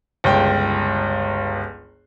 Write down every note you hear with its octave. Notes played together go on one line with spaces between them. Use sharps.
G1 C#2 G5